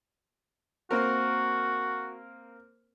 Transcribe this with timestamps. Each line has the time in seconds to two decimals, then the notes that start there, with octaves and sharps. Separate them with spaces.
0.91 A#3 C4 F#4 A#4